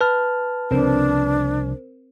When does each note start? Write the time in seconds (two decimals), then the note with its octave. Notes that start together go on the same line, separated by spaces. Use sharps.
0.01 B4 A5 F6
0.71 C2 C#3 F3 C4 D4 A#4 C5